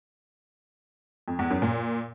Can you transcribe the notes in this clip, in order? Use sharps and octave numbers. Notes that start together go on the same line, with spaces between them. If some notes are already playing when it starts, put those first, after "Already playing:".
F2
E2
F#2
A#2